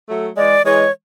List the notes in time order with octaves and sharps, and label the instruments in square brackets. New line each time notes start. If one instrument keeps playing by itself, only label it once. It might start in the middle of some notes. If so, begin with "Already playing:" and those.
[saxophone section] F#3 A3
[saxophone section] E3 G#3 [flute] D5
[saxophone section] E3 G#3 [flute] C#5